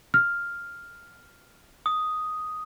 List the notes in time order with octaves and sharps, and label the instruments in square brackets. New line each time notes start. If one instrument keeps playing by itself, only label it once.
[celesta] F6
[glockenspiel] D#6